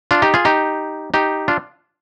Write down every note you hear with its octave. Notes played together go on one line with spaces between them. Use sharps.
D4 F4
D#4 G4
F4 G#4
D#4 G4
D#4 G4
D4 F4